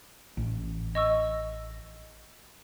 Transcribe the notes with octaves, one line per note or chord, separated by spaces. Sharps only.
A1
D#5 C#6 E6